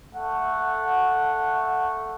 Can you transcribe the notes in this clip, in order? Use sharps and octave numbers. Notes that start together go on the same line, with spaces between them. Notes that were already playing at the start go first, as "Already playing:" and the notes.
A3 F#5